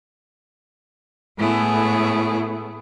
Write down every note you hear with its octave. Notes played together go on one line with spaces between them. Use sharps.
A2 A3 B3 E4 G#4